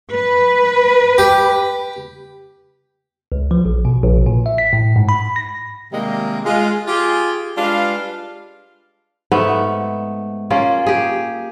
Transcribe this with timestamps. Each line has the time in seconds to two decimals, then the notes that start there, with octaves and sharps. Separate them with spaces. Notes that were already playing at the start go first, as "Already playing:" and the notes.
0.12 B4
1.18 G4
3.32 C#2
3.51 F3
3.65 A#1
3.85 B2
4.02 A#1
4.26 A#2
4.46 E5
4.58 B6
4.73 A2
4.96 G#2
5.09 B5
5.36 A#6
5.93 C3 D#3 G3 G#3 A#3
6.45 G#3 F4
6.87 F4 G4 G#4
7.58 G3 G#3 D4 F4 B4 F5
9.32 G#2 A3 B3
10.50 A#3 C#4 F4 G#4
10.86 G4 G#4